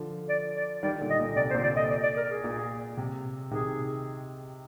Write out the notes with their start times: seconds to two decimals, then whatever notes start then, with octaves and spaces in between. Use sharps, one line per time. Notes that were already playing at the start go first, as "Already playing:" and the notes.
Already playing: D3 F3
0.29 D5
0.56 D5
0.83 D#3 G3 D5
1.01 A#2 D3
1.10 D#5
1.19 A#2
1.36 C3 D5
1.50 C5
1.54 A#2 D3
1.64 D5
1.76 D#5
1.90 D5
2.03 D5
2.17 A#4
2.30 G#4
2.44 A#2
2.97 C3
3.51 C3 D#3 G#4